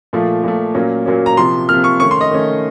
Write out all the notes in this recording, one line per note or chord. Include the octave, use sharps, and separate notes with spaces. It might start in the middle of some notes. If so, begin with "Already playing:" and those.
A#2 F3 A3
A#2 F3 A3
A#2 F#3 A#3 C#4
A#2 F#3 A#3 C#4
A#5
C3 F3 A#3 C6
C3 F3 A#3 F6
C#6
D#3 A3 C#4 C#6
C6
D#5
D#3 A3 C#4